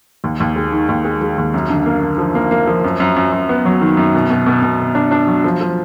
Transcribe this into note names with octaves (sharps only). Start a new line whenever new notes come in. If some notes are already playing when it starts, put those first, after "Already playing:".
D#2
D#2
G#3
D#3
D#2
G#3
G#3
D#2
F#2
D3
A#3
D3
F3
A#3
A#3
F3
F#2
F#2
F#2
F#2
B3
F#3
D#3
F#2
B2
B2
B2
B2
B2
D4
D4
F#3
F3
F3